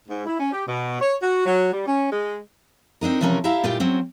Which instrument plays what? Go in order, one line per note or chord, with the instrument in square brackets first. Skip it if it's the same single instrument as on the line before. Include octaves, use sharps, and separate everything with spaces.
[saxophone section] G#2
E4
C#4
G4
B2
C#5
F#4
F#3
G3
C#4
G#3
[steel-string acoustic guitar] C4 D4 D#4 A#4
C3 E3 F3 G3 C#4 A#4
E4 G4 E5 F5 A#5
A#2 G3 F4 G4 G5
F#3 C4 C#4